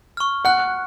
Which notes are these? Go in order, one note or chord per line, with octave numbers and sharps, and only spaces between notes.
C#6 F6
F#5 F#6